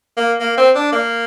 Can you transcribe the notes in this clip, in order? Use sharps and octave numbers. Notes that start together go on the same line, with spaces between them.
A#3
A#3
C4
D4
A#3